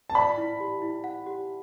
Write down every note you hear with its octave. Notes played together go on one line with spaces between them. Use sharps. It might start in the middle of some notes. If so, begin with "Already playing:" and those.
A5
D5 B5
E4
G4
E4
F#5
G4